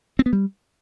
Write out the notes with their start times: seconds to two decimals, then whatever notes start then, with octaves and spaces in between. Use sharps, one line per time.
0.19 C4
0.26 B3
0.33 G3